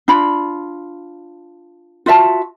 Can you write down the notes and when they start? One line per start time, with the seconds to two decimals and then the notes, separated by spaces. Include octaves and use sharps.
0.08 D4 F4 B5
2.06 F4 F#4 E5 A5